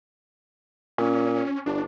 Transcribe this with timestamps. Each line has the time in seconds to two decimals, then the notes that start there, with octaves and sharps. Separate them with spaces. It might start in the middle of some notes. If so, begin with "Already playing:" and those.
0.98 A#2 C#4
1.66 G1 D4